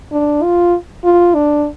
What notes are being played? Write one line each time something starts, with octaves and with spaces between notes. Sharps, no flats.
D4
F4
F4
D4